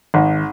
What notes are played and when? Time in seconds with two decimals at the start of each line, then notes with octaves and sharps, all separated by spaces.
0.14 G#1